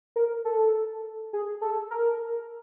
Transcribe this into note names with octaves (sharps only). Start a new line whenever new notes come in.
A#4
A4
G#4
A4
A#4